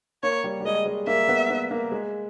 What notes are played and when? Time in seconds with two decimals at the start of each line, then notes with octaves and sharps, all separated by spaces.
0.23 A#3 C#5
0.44 G3
0.60 G3
0.65 G#3 D#5
0.86 G#3
1.07 A#3 E5
1.28 B3
1.50 B3
1.71 A#3
1.92 G#3